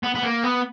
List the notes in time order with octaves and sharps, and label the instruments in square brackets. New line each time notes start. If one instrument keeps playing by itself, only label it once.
[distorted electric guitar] B3
B3
A#3
B3